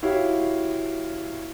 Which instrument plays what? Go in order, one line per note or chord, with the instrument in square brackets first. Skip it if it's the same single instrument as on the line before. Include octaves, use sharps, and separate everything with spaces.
[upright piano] E4 F#4 G4 C#5 F5